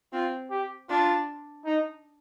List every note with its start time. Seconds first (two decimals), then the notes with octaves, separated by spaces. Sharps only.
0.13 C4 F4
0.51 G4
0.89 D4 F4
1.65 D#4